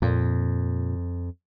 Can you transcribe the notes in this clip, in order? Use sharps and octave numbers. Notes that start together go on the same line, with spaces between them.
F2 A#2